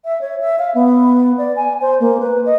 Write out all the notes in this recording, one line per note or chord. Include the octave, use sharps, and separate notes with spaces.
E5
C#5
E5
F5
B3
D5
G#5
C5
A#3
B4
D#5